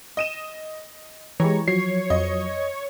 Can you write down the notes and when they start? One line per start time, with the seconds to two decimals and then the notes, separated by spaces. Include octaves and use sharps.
0.17 D#5 D#7 E7
1.40 E3 G#3 G4 C#5 A#5
1.68 F3 F#3 C#5 C7
2.10 F2 D#5